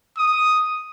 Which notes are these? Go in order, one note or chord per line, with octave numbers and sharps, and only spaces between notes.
D#6